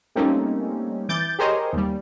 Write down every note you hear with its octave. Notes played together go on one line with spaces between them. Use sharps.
G3 A3 A#3 C4 C#4 D#4
E3 D6 G6 A6
G4 G#4 A#4 C5 C#5 D#5
D#2 G3